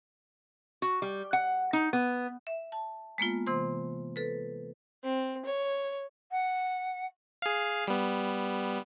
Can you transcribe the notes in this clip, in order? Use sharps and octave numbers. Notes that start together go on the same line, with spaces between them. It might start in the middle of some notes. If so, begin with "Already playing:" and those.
F#4
G3
F#5
D#4
B3
E5
A5
G#3 A#3 B3 F4
C3 E3 C5 C6
A4 B4
C4
C#5
F#5
G#4 F5
G3 B3